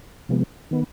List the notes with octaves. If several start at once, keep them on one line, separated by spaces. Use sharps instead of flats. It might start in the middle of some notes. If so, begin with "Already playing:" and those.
C3 F3 G#3 B3
D#3 B3